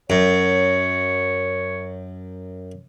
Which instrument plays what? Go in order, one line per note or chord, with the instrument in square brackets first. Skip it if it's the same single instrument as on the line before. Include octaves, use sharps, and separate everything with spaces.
[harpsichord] F#2 [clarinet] C#5